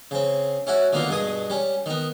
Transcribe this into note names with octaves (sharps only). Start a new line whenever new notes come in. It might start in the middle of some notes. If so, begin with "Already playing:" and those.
C#3 C4
C#4 E4 F#4
D3 D#3 A#3 B3 F4
G2 B2 G#4 D#6
G3 C#4
D#3 B3